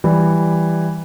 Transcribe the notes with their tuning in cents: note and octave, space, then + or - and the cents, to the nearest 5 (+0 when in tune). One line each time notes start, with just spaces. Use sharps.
E3 +0 G3 +0 D5 +0